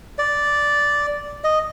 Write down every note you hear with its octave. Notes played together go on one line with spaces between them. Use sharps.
D5
D#5